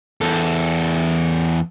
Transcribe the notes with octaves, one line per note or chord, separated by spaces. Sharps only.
E2 A4